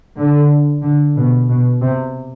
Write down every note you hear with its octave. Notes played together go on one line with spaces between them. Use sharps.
D3
D3
B2
B2
C3